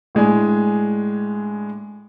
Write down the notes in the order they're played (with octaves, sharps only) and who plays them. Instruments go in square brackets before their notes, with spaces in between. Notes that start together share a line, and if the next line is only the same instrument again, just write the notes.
[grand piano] A2 G#3 D4 G#5